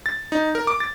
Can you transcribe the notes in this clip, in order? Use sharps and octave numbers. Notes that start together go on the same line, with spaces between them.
A6
D#4
A#4
D6
A6